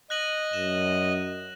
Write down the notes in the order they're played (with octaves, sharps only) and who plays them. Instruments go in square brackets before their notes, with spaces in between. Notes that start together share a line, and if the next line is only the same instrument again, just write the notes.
[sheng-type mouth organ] D#5 [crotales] F#6 A#6 F#7
[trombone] F#2 [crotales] E7